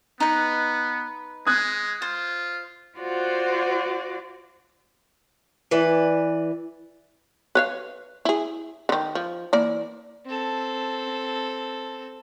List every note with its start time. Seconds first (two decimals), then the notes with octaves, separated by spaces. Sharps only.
0.20 B3 D#4 B4
1.47 G#3 D#6 F#6 G#6
2.02 F4 C5
2.98 F4 F#4 C5 D5 F#5
5.71 E3 B4 D5
7.55 B4 C#5 F5
8.25 E4 G#4
8.89 D3 D#3
9.15 F3
9.53 E3 A#3 D5
10.26 C4 A4